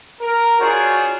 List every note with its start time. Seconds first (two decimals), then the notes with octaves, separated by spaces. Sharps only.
0.21 A#4
0.60 D4 F4 F#4 G#4 C5 C#5